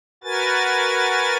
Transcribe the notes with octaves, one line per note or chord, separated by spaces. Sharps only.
F#4 A#4 B4 G#5 A6